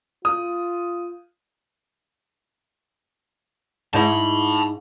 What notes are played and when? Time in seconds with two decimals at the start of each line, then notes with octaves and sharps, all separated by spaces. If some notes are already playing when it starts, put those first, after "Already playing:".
0.25 F4 D#6
3.94 G#2 D#4 E4 A5 B5